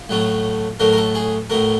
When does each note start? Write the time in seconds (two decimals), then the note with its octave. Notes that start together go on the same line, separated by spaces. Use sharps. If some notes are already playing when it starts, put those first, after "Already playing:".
Already playing: F4
0.09 A2 F#3 A3
0.80 A2 F#3 A3 A#4
0.93 A#4
0.97 A4
1.15 G#4
1.50 A2 F#3 A3 A#4